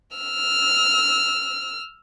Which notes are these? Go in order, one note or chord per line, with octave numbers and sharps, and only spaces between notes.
E6 F6